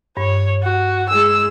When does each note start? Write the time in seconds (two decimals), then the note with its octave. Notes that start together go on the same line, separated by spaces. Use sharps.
0.17 G2 C#5
0.62 F#4
1.09 G#3 G#4 E6